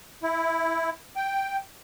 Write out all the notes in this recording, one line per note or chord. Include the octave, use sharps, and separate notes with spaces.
E4
G5